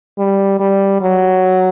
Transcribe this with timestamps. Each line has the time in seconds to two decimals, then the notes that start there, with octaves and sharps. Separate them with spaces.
0.19 G3
0.60 G3
1.02 F#3